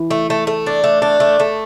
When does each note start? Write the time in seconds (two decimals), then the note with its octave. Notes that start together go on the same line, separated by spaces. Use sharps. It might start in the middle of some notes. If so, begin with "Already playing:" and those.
Already playing: E3
0.11 A3
0.30 A3
0.47 A3
0.67 D4
0.84 A3
1.02 D4
1.20 A3
1.40 A3